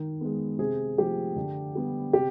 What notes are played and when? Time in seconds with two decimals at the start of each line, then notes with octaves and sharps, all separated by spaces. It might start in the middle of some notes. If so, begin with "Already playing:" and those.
Already playing: D#3
0.21 G#3 B3
0.59 C3 G#4
0.98 F3 A3 G4
1.36 D3
1.75 G3 B3
2.13 C3 G4